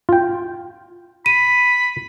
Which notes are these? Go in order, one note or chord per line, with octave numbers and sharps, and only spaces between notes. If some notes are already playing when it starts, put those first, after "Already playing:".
F4 G5
B5 D#7